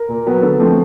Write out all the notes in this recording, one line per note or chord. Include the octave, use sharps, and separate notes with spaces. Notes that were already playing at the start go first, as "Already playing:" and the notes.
Already playing: A#4
A#2
F#3 B3
D3 A4
F3 A3 C4